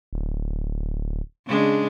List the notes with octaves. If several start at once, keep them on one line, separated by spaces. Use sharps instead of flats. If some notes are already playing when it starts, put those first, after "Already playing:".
D1
C#3 G#3 D4